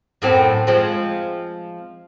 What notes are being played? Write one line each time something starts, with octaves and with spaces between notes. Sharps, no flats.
F#2 A2 C4
F3 G#3 C4